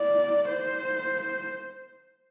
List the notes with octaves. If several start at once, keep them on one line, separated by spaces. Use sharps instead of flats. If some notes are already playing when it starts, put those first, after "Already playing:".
Already playing: D5
C5